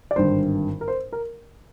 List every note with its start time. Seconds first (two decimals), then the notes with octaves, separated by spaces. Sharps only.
0.11 D5
0.16 G#1 G2 D3 C5
0.81 A#4
0.88 C5
1.12 A#4